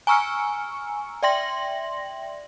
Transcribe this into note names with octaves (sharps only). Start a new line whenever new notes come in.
G#5 A#5 C#6 E6 F6 C#7
D5 E5 G5 C6 A#6 F#7